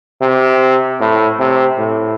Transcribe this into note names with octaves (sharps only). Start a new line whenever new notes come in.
C3
A2
C3
A2